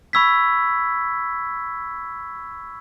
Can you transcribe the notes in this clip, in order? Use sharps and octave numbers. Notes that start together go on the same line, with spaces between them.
B5 C#6 E6 G#6 B6